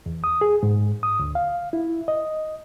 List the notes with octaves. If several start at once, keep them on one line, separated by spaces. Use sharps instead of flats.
E2
D#6
G#4
G#2
D#6
D2
F5
E4
D#5